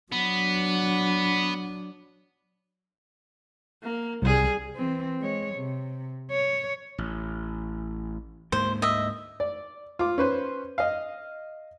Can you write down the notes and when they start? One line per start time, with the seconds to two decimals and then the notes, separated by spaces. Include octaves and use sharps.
0.12 F#3 B3 D4
3.83 A#3
4.22 C2 G3 G#4
4.76 E3 C4
5.20 G#3 C#5
5.55 C3
6.31 C#5
6.98 A1
8.52 D2 G#2 A#3 C5
8.82 D#5 E5
9.40 D5
9.99 F4 D6
10.18 C#4 B4 C5
10.78 D#5 F5